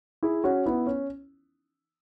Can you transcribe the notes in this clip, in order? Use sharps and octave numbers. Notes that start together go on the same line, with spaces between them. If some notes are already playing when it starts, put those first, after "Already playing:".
E4 G#4
C#4 F#4
B3 E4
C#4